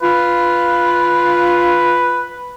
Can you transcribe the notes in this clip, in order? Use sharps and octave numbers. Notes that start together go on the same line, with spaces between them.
F4 B4